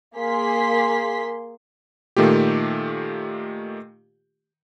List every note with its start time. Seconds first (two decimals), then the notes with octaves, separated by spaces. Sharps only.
0.16 A#3 G#4 C6 B6
2.17 A#2 D#3 A3 F4 G4